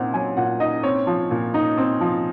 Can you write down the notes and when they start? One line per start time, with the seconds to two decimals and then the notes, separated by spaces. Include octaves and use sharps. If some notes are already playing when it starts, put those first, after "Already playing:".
Already playing: A#2 C4 D#4 F#5
0.14 F#3 G#5
0.37 A#2 F#5
0.60 D#4 D#5
0.83 C4 C#5
1.07 F3
1.31 A#2
1.54 D#4
1.78 C4
2.01 F3